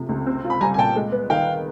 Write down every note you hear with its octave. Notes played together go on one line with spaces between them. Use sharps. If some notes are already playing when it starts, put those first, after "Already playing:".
Already playing: C3 F3 A3
C#2
C4
F4
B5
G3 G#5 A#5
G#5
A#2 G5 A5
G#3
B3
D#3 F5 G5